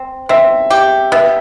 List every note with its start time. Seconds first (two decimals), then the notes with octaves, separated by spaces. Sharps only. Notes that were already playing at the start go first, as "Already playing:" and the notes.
Already playing: C4
0.29 C4 E5
0.71 G4
1.12 B3 E5